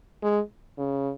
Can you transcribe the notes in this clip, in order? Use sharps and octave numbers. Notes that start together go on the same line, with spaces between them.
G#3
C#3